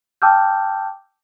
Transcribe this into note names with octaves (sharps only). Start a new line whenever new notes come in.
G5 A5 D6 E6 F6 G6